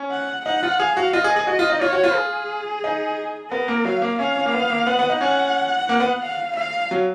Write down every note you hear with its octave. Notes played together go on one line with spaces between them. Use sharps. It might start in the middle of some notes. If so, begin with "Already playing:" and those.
Already playing: C#4
F#5
D#4 F#5
F4
G#4 F5
F#4
F4 D#5
G#4
G#4
F#4 D#5
F4
D#4
F4 C#5
F#4
F4
G#4
D#4
B3 A#4
A#3
F#3 F5
A#3
C#4 F5
C#4
A#3
B3
A#3
B3 F#5
B3
D#4
C#4 F#5
A#3
B3
F5
F5
F#3